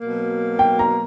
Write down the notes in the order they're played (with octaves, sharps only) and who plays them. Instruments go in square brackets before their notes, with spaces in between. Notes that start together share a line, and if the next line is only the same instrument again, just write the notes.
[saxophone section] B2 F#3 A#3
[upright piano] G5
A#5